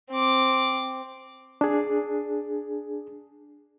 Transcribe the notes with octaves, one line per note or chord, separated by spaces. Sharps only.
C4 D6
D4 G#4